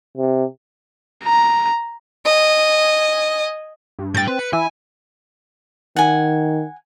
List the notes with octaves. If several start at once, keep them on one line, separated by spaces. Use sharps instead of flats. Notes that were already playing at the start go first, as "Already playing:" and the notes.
C3
A#5
D#5 G#5
G2
A2 G5 G6 A6
C4 B4
C#7
E3 E4 G#5
D#3 F#5 G#5